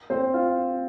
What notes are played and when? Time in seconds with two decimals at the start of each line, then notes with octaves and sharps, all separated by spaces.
0.10 C4 C5
0.34 F4 F5